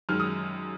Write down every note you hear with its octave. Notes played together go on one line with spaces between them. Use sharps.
F#2 D#3 G#3 F6
D#6